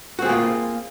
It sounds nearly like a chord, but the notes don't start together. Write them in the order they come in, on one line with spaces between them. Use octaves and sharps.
F#4 C4 G#4 A#3 F4